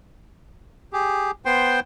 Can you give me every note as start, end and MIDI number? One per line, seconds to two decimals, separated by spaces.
0.93 1.31 67
0.93 1.31 68
1.45 1.80 59
1.45 1.80 72
1.45 1.80 79
1.45 1.80 84